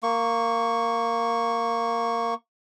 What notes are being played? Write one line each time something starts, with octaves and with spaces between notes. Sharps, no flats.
A#3 C#6